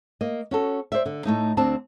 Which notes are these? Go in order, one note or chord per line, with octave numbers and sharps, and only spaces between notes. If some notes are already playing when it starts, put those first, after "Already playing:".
A#3 D#5
C#4 F#4 A4
C5 D5 E5
D3
A2 A3 D#4
D2 C4 D4 A5